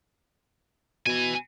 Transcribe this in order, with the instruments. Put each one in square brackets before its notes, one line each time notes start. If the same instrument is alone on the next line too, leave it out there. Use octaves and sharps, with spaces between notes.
[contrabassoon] B2 [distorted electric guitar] E3 G#5 [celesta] D#7